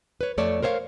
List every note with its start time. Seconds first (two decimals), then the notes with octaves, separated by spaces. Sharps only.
0.21 B4 C#5
0.38 F2 A3 C#5 D5 A5
0.63 A#4 C5 C#5 E5 F5